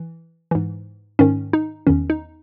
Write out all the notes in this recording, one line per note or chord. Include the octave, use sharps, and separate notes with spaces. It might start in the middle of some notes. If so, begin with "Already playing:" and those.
Already playing: E3
G#2 E3
G#2 D#3 C#4
D#4
E2 D#3 C#4
D#4